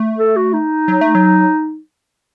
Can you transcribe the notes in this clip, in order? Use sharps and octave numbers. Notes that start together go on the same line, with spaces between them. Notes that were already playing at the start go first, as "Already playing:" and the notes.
Already playing: A3
A4
F#4
D#4
F#3
A3
F#3